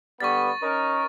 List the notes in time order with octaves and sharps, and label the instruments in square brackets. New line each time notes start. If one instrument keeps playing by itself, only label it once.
[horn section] D3 G3 B3 [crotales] C#6 A6
[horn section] C#4 D#4 A#4